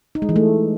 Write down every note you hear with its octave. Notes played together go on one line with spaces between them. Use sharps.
D#4
G#3
E3
A3